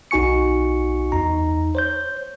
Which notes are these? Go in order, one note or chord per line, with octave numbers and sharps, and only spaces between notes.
B1 D#4 F#4 G#5 C#6 C#7
E2 D#4 A#5
C5 C#5 G6